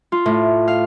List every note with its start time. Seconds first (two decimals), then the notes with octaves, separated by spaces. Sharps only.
0.12 F4
0.26 A2
0.68 F5